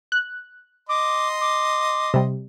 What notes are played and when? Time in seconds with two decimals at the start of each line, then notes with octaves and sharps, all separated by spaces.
0.12 F#6
0.89 D#5 C6 D6
1.41 D6
2.14 C3 G3